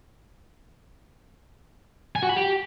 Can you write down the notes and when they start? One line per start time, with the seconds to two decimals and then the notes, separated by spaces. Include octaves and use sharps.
2.16 G#5
2.23 F#4
2.29 B5
2.36 G4